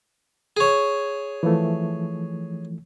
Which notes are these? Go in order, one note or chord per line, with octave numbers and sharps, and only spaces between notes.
G#4 C#5
E3 F3 A3